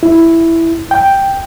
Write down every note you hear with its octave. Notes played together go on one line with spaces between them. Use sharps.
E4
G5